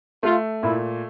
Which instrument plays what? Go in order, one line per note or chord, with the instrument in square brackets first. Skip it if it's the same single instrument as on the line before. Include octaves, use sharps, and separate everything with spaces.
[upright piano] A3 [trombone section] F4
[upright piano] A#2 [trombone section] E4